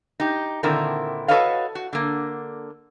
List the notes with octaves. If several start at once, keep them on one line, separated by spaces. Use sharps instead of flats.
D#4 G4
A#2 D3 D#3 C4 E4 A#4
F#4 A4 B4 C#5 D#5 F5
F#4
D3 A#3